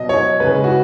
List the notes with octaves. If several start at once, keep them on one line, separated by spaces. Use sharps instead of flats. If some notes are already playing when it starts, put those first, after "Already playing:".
Already playing: B2 F#3 D#5
C#5
C#3 G#3 B4
F#4